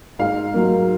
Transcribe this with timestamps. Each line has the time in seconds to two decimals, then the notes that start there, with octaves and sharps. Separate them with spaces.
0.19 G#2 F5
0.54 F#3 A#3